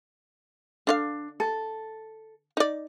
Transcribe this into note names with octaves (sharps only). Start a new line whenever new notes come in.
D3 D4 F4 F5
A4
D#4 D5